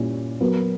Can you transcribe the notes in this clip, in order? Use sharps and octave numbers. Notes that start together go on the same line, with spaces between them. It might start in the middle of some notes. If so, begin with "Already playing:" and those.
Already playing: A#2 G3 C#4 E4
F#3 B3 F#4 A#4